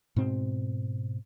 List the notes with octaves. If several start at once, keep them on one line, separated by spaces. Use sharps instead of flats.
G#2 B2 C4